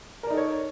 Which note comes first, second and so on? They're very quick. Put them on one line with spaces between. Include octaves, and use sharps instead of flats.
A#4 D5 D#4 A4 C#5